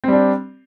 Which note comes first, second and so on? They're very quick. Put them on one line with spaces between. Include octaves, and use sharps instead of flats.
C4 G3 D4